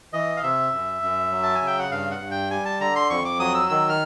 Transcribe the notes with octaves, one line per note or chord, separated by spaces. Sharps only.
E3 D#5
F5
C3 E5
F#2
F#2
F#3
A5
G#5
C#3
G5
F#5
G2 F5
F#5
G2
G5
G3 G#5
A5
D3 A#5
C6
F2 C#6
D6
F#3 D#6
E6
D#3 E6
F6